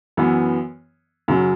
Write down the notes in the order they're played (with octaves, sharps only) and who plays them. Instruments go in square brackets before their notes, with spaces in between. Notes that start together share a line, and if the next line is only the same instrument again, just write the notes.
[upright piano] F#2 E3 B3
F#2 C#3 F#3